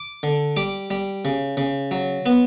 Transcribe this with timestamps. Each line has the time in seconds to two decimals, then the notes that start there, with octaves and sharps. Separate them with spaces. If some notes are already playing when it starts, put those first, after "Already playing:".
Already playing: D6
0.23 D3
0.56 G3 D6
0.91 G3
1.25 C#3
1.57 C#3
1.91 F#3
2.26 B3